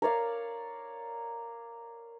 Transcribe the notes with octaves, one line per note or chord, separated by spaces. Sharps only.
A#4 C#5 D5 F5